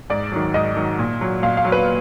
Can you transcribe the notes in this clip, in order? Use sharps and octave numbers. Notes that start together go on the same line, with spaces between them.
G#2 D5
D#3 F#3
G#2 D#5
D#3 F#3
A#2
F#3
A#2 F5
F5
F#3
B4